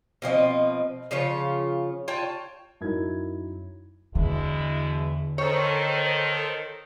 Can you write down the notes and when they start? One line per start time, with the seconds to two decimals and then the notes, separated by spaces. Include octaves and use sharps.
0.22 B2 F3 C4 D#5
1.11 C#3 F3 F4 C#5
2.08 F4 C#5 G5 A5
2.81 F#2 D#4 E4 A#4 G#6
4.15 E2 B2 D3 G#3 E4
5.38 D#3 A4 C5 C#5